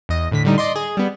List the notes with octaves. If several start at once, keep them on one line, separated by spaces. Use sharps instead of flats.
E2 D#5
A2 D3 B6
A2 D3 G3 D#4
D5 D#5 C6
G#4
G3 B3